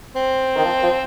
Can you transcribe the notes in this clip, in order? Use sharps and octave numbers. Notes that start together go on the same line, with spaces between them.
C4
D#3
F3
F3